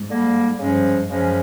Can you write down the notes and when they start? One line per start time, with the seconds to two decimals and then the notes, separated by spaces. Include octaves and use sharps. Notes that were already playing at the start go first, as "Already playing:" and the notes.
Already playing: G#2
0.10 D3 G3 A#3
0.59 G2 C#3 F3 G#3 C#4
1.08 F#2 C#3 F3 G#3 C#4